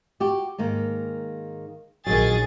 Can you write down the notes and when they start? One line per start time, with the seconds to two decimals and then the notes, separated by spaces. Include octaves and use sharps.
0.20 F#4 G4
0.58 G#2 D#3 A#3
2.06 A#1 D#3 F#3 G#4 A6